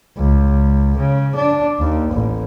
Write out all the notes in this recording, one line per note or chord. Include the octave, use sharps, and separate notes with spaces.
C#2
C#3
D4
D#2
A1